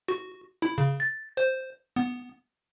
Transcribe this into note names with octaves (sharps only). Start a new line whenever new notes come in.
F#4
E4
C#3
A6
C5
B3